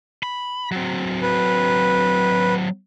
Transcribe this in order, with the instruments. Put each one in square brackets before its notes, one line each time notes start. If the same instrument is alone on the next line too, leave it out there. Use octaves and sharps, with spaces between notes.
[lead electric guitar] B5
F#3 C4
[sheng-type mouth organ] B4